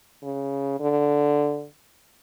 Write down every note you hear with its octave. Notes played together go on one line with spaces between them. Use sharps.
C#3
D3